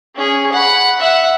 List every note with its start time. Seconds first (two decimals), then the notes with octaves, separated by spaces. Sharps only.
0.15 C#4 G#4
0.52 F#5 B5
1.00 E5 F#5